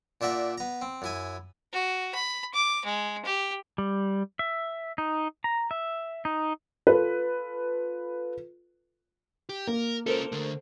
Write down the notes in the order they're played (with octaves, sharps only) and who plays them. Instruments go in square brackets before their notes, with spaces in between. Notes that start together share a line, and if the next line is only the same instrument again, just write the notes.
[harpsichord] A#2 D4 E5 F#5 A#5
B3 A#5
C4
F#2 E4 G#5
[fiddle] F#4
B5
D6
G#3
G4
[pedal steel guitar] G3
E5
D#4
A#5
E5
D#4
[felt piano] F4 A4 B4
[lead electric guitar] G4
[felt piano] A#3 [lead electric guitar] A#4
[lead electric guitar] C#4 F4 [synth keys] A4 A#4 C5
[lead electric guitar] D3 A3